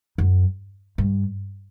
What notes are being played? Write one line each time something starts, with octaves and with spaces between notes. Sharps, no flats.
F#2
G2